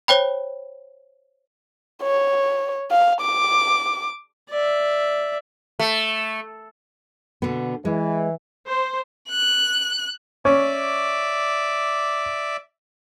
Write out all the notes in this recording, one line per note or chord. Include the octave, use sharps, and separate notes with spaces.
C5 C#5 G5 B5
C#5
F5
D6
D5 E5
A3
B2 D3 B3
E3 G#3
C5
F#6
C#4 D5 E5 D6